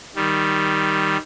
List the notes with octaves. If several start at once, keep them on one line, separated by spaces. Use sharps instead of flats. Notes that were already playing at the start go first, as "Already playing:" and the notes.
D#3 G3